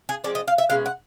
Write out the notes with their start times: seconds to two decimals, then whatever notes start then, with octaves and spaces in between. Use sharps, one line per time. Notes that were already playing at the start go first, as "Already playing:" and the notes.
0.09 G#4
0.24 F3 G#3 C4 D5
0.35 D#5
0.48 F5
0.58 E5
0.70 B2 G#3 C#4 F5
0.86 F#5